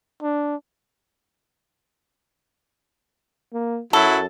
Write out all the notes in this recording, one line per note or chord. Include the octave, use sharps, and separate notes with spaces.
D4
A#3
F#2 F#3 E4 F#4 A4